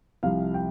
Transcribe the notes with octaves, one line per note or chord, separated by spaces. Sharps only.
C2 C3 F3 F5
G5